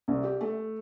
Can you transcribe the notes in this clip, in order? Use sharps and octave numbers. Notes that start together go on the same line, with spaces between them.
C2
G4
A3